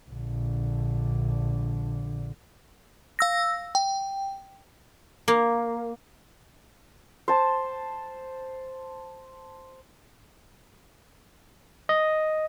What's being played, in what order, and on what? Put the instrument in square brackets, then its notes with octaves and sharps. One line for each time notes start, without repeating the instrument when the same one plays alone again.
[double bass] A#1 D3
[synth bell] F5 E6 A#6
G5
[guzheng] A#3
[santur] C5 A5
[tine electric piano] D#5